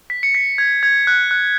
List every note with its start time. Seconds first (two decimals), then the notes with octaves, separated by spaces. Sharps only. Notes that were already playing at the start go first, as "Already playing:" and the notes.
0.10 B6
0.23 C#7
0.35 B6
0.58 G#6
0.83 G#6
1.07 F#6
1.31 F#6